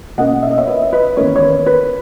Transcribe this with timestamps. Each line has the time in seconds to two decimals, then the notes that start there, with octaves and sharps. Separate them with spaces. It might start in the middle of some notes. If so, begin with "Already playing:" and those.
0.18 B2 A#3 C#4 D#5 F#5
0.43 E5
0.50 D#5
0.58 C#5 E5
0.67 B4 D#5
0.82 E5
0.93 B4 D#5
1.17 E2 D#3 A#3 C#4 A#4 C#5
1.36 C#5
1.42 B4
1.66 B4